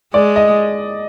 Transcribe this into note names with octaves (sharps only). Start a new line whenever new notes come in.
G#3 D5
D#5